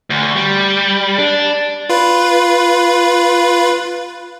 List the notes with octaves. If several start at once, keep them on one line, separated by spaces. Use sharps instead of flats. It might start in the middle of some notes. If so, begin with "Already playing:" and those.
D2
G3
D4
F4 B4